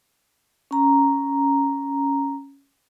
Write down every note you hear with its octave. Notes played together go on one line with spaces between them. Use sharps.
C#4 A#5